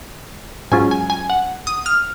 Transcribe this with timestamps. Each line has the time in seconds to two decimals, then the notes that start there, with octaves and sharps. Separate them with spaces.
0.72 G#2 F#3 C#4 F4 G#5
0.91 G#5
1.10 G#5
1.30 F#5
1.67 D#6
1.86 F6